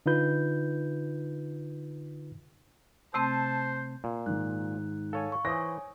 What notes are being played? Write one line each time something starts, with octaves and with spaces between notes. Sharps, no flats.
D3 D#4 F4 B4 G6
C3 A3 C4 C5 A5
A#2
G#2 D#3 F#6
A4 C#5 F5 G#5
C#6
E3 C5 C#5 G#5 D#6 A#6